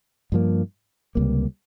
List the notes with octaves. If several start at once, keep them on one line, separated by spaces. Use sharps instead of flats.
G2 F3 A#3
C#2 C3 G3 A#3